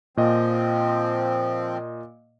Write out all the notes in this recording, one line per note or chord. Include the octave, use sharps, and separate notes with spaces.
A#2 F3 C4 D#5